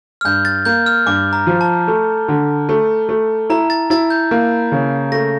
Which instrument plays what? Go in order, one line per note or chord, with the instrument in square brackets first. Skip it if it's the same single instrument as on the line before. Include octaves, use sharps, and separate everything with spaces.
[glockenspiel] F6
[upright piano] G2 [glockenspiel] G6
[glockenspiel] A6
[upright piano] A#3 [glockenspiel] G6
[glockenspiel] F6
[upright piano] G2 [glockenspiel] D6
[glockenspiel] A#5
[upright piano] F3
[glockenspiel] A5
[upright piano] A3
D3
A3
A3
[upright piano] E4 [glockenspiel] A#5
[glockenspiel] A6
[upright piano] E4 [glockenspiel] A6
[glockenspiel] G6
[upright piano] A#3
C#3
[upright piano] A3 [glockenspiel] A#6